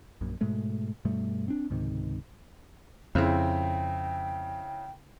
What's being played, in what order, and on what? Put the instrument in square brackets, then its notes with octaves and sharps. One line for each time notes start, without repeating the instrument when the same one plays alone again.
[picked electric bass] A#1 F#2 A#2
G#2 B2 G#3 A3
G2 B2 G3 A3
C4 D4
C#2 G#2 C3 D#3
[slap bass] F2 [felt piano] C#3 C4 E4 [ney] G5